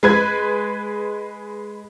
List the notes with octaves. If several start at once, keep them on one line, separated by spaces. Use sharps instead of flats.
G#3 B4 G#6